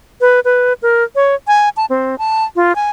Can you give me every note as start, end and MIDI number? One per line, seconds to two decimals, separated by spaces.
0.21 0.40 71
0.45 0.73 71
0.82 1.04 70
1.15 1.35 73
1.47 1.69 80
1.77 1.86 81
1.90 2.18 60
2.18 2.45 81
2.56 2.75 65
2.75 2.90 80